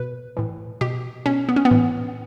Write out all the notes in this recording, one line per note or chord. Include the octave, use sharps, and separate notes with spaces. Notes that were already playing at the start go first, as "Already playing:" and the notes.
Already playing: B2 B4
A2 E3
B2 G4
B2 C#4
B3
C#4
B3
A2 E3